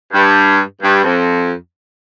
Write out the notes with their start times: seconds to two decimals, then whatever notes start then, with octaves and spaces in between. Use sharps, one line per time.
0.13 G2
0.82 G2
1.04 F2